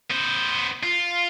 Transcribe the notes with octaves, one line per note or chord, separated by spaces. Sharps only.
B3 C5
F4